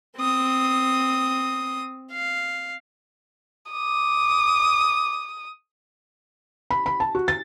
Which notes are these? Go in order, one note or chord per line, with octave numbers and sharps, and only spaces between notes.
C4 D#6
F5
D6 D#6
B5
B5
A5
F#4
A6